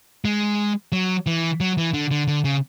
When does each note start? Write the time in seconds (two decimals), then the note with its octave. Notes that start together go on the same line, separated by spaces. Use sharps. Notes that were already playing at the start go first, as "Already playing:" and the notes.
0.25 G#3
0.92 F#3
1.26 E3
1.60 F#3
1.77 E3
1.94 D3
2.11 D3
2.28 D3
2.44 C#3